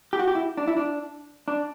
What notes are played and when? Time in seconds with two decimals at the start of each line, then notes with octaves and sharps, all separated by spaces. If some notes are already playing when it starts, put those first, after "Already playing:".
0.13 G4
0.19 F#4
0.28 G4
0.35 E4
0.57 D4
0.68 E4
0.77 D4
1.48 D4